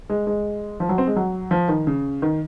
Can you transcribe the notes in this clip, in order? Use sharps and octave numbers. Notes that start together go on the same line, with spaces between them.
G#3
G#3
F3
F#3
C4
G#3
F#3
F3
D#3
C#3
D#3